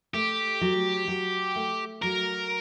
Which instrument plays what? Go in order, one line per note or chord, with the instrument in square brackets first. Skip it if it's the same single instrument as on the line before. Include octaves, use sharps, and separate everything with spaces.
[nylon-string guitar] A3 [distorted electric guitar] G4
[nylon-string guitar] F#3
F#3
A3
[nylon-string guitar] F#3 [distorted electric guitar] A#4